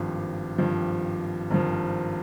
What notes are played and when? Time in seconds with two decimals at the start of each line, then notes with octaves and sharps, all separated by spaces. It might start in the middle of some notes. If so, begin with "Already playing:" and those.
Already playing: G#1 G2 F3
0.58 G#1 G2 F3
1.50 G#1 G2 F3